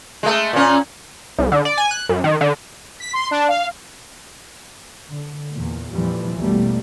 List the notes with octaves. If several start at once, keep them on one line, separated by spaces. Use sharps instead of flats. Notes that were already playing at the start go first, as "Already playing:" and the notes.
G#3 A3
A#2 C#4
C2
D3
D5
G#5
F#6
F#2
D#3
D3
B6
C6
D4
F5
D3
E2 A#2
F2 A#2 E3 F3 G3
A1 E2 B2 G3 A3 A#3